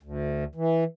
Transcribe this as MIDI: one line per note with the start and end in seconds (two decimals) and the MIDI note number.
0.03 0.44 38
0.55 0.84 52